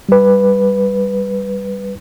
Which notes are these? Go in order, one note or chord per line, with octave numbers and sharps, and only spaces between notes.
G3 B4